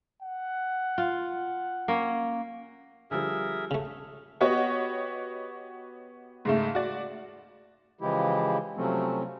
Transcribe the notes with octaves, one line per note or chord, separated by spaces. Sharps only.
F#5
F4
A#3 C#4
D3 F3 G3 G#4 A#4 E5
C#3 A3
B3 F#4 G4 C#5 D#5 F#5
G#2 C#3 A3
F#4 D5
C#3 E3 F3 G#3 E4 G4
C3 F3 F#3 A3 C4 C#4